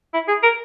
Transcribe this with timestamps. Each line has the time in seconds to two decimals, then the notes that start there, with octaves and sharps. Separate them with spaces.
0.14 E4
0.28 G#4
0.43 A#4